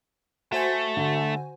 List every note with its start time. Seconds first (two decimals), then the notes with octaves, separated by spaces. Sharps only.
0.52 A3 F#4 C5 G#5
0.97 D3